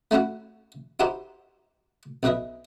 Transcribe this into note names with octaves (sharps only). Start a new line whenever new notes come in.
A3 C#4 E4 F#4 F#5
D#4 E4 F#4 G4 C5 B5
B1 B2 B4 D#5 E5